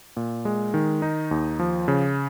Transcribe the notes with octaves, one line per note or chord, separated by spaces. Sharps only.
A#2
G#3
D#3
D#4
D#2
F3
C#3